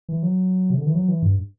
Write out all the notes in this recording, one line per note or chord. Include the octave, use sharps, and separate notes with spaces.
E3
F#3
C3
D3
E3
F#3
E3
G2